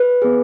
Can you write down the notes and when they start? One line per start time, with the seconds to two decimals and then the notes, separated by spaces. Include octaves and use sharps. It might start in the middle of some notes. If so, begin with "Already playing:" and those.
Already playing: B4
0.22 B3 G#4